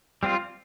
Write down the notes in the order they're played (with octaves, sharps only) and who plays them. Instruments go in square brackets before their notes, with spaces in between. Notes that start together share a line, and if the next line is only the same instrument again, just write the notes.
[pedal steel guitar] G3 C4 F4